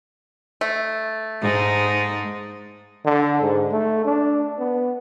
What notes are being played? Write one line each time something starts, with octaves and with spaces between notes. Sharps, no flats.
A3
G#2 D#4
D3
G#2
A3
D4
B3